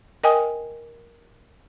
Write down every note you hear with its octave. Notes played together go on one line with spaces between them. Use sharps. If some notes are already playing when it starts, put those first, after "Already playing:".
A#4 D#5 G5 G#5 D#6